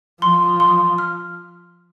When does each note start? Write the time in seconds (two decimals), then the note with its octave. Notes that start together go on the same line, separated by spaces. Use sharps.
0.22 F3 C6
0.60 C6
0.98 F6